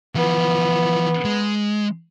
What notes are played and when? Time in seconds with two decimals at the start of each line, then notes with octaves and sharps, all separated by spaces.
0.15 E3 F3 B3
1.25 G#3